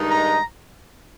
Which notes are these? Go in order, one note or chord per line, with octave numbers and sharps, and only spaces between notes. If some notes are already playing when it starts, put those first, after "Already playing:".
Already playing: G2 D#3 G#3 D#4
A#5